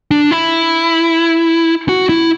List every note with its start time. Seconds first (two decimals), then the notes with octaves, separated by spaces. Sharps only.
0.11 D4
0.31 E4
1.89 F#4
2.09 E4